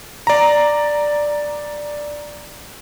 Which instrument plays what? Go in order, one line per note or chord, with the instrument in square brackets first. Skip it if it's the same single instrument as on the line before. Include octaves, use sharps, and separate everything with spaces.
[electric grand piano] D5 A#5